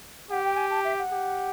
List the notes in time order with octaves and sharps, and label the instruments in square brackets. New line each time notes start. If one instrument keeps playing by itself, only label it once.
[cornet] G4 [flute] F#5
[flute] G5
G#5
A5
E5
F#5
[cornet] G4